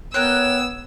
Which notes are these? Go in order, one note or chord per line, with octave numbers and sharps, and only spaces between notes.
B3 A#4 C#5 G5 E6 F#6